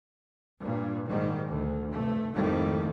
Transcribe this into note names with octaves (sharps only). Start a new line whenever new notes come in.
G2 A#2
G#2 D#3 G3
D2
F1 G2 A3
G#1 F2 A2 D#3 G3 A3